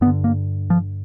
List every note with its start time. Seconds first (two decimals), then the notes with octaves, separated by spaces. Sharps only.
0.01 G2 B3
0.06 D3
0.24 A#3
0.70 F3